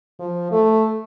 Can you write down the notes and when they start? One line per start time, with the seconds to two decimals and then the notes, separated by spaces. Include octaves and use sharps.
0.19 F3
0.51 A3